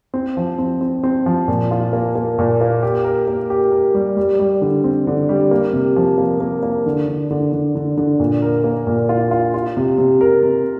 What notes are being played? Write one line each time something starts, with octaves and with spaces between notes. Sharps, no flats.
C4
F3
C4
C4
C4
F3
A#2
F4
A#3
A#3
A#2
A#3
G4
A#4
A#3
G4
A#4
G3
G3
G3
D3
C4
D3
G3
A#3
C3
F3
A#3
A#3
A#3
D3
D3
D3
D3
D3
D3
A#2
A#4
A#3
A#2
F4
F4
F4
C3
C3
A#4
C3